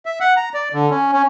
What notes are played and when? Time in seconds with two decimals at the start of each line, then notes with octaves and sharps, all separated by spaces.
0.06 E5
0.20 F#5
0.37 A#5
0.54 D5
0.73 D3
0.91 C#4
1.13 C#4